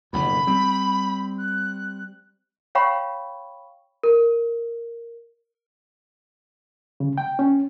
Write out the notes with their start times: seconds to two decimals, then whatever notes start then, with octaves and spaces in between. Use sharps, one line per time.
0.13 F#1 B1 F2 B5
0.47 G3 C4
1.39 F#6
2.75 C#5 F5 G5 B5 C#6
4.03 A#4
7.00 C#3
7.18 G5
7.39 C#4